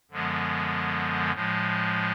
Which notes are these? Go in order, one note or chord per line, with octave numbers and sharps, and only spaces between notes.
F#2 D3 F3 G#3 B3
A2 F3 G#3